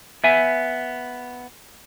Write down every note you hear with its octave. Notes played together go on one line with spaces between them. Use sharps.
B3 E5 G#5